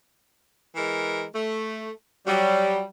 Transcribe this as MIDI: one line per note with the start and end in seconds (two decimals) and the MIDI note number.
0.76 1.24 52
0.76 1.24 56
0.76 1.24 70
1.33 1.91 57
2.26 2.79 54
2.26 2.83 55